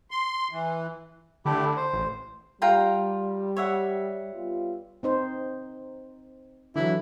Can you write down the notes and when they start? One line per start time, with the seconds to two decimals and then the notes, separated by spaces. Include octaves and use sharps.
0.11 C6
0.51 E3
1.45 D3 A3 E4 G4
1.77 C5
1.93 A1
2.62 G3 F4 G5 A#5
3.57 C#5 E5 F#5
4.34 G3 B3 F4
5.03 C4 D#4 C5
6.76 D3 E3 F#3 E4